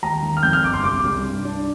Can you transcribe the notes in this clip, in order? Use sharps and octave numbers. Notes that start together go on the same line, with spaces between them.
D#2 A#5
D#3
F6
F2 G6
F6
G1 D6
C6
C2 D6
C2
G2
D4